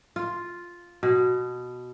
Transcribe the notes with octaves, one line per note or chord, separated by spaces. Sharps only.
F4
B2